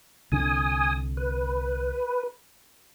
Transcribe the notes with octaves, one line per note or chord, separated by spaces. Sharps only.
C2 D3 D4 G#5 D#6
B4